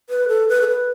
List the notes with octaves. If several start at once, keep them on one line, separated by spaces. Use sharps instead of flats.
B4
A4
B4
A4
B4